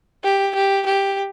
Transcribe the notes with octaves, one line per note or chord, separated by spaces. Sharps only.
G4
G4
G4